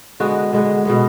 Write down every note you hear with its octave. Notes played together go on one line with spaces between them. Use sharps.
D3 G#3 B3 F#4
D3 G#3 B3
B2 G#3 B3